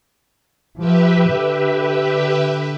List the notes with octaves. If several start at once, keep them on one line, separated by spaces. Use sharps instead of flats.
F3 G4 B4 E5
D3